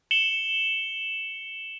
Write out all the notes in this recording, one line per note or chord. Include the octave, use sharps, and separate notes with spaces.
C#7 E7 F#7 G7